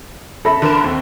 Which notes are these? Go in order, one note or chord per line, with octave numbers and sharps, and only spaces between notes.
A4 E5 B5 A#6
D3 A#4 E7
D#2 C4